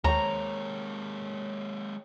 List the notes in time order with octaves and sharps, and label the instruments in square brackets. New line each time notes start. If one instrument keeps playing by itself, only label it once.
[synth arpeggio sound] D#2 [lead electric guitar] G#3 A#3 [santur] C#5 G5 [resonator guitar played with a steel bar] A#5